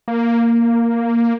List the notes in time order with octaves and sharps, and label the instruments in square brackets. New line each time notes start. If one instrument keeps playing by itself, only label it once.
[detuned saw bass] A#3